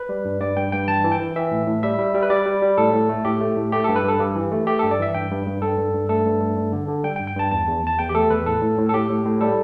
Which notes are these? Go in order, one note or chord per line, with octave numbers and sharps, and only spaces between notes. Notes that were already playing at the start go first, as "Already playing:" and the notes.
Already playing: B4
G3
G2
G2 D5
G2 G5
G2 G5
E3 A5
E3
G5
E3
E3 E5
A2
A2
G3 E5
G3
G3
B4
G3 D5
G3
G3
A2 A4
A2
A3
A2 G4
A3
A2
A3 G4
G2 A4
B4
G2 A4
G2 G4
E3
A3
A3 G4
G2 A4
D5
E3 E5
G2 G5
G2
G2
G2 A4
G2
G2
A3 A4
G2
A3
G2
D3
D3
G3 G5
G5
G2
G5
G2 A5
E2 A5
E2
E2 A5
E2 G5
G4
A3 A4
E2 B4
A2 A4
A2
A2
A4
A2 G4
A2
A2
G3 A4